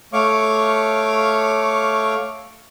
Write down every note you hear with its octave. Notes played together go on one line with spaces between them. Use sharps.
A3 C#5 F5 C#6 D6